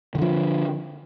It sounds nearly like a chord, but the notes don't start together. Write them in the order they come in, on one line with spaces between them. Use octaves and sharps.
D#3 D3 F3